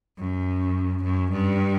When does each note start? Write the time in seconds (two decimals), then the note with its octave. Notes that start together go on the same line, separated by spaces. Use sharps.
0.19 F#2
1.04 F#2
1.32 G2